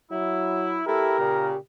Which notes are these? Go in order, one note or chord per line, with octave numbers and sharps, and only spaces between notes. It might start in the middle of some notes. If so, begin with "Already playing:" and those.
F#3 E4
A3 E4 G4 A#4
A#2 C#3